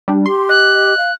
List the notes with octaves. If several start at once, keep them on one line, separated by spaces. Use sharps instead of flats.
G3 D4
G4 C6
D#5 F#6
F5